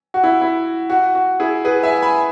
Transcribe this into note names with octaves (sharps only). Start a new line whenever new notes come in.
F#4
E4
E4
F#4
F#4
E4 G#4
G#4 B4
E5 G#5
G#5 B5